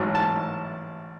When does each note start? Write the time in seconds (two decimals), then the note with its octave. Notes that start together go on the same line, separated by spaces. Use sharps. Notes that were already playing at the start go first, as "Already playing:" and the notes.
Already playing: A1 G#2 F#3
0.15 A5